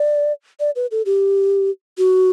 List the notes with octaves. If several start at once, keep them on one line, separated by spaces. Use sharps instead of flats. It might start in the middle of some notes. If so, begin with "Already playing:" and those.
Already playing: D5
D5
B4
A4
G4
F#4